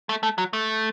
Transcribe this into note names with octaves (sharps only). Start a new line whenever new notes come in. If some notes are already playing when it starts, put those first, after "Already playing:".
A3
A3
F#3
A3